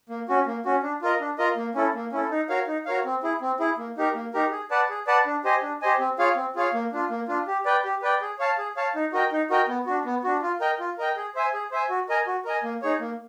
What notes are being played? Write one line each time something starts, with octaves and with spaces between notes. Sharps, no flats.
A#3
C#4 F#4
A#3
C#4 F#4
D4
F4 A#4 D#5
D4
F4 A#4 D#5
A#3
C#4 E4 A4
A#3
C#4 E4 A4
D#4
F#4 A#4 C#5 F5
D#4
F#4 A#4 C#5 F5
C4
E4 G#4
C4
E4 G#4
A#3
D#4 G4 A#4
A#3
D#4 G4 A#4
G#4
B4 D5 F#5 A5
G#4
B4 D5 F#5 A5
D4
G4 C5 D#5 G#5
D4
G4 C5 D#5 G#5
C4
F4 G#4 C#5 F5
C4
F4 G#4 C#5 F5
A#3
D4 F4
A#3
D4 F4
G4
B4 D5 G5
G4
B4 D5 G5
G#4
C#5 F5 A5
G#4
C#5 F5 A5
D#4
F#4 A#4 D#5 G5
D#4
F#4 A#4 D#5 G5
B3
D4 F#4
B3
D4 F#4
F4
A#4 D#5 G5
F4
A#4 D#5 G5
G#4
C5 E5 G#5
G#4
C5 E5 G#5
F#4
A#4 D#5 G#5
F#4
A#4 D#5 G#5
A#3
D#4 G#4 C#5
A#3